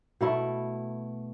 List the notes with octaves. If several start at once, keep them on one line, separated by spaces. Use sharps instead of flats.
B2 A3 E4